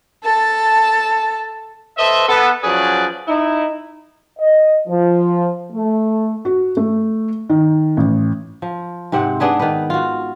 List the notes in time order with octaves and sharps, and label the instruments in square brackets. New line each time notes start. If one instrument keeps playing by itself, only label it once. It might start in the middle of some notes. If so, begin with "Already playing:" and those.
[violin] A4 A5
[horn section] A4 B4 C5 D#5 E5
B3 A4
F3 F#3 C#4 G#4 B4 D5
D#4 E4
[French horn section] D#5
F3
A3
[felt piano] F#4
A3
D#3
A1
[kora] F3
G#2 C3 C4 F#5
B3 D4 G#4 B4
D#3 B4
F4 F#4